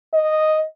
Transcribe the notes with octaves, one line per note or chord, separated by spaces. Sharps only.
D#5